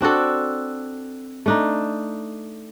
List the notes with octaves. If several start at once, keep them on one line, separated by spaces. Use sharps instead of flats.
C4 D4 F#4 A4
A3 D4 D#4